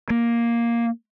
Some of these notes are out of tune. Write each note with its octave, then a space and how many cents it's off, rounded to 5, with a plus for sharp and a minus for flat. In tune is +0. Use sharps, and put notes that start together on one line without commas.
A#3 +5